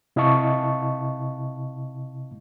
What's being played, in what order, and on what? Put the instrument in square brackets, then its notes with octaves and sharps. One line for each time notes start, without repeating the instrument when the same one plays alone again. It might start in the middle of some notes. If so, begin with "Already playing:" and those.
[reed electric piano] C3 E4 D#5 F5 A5 C#6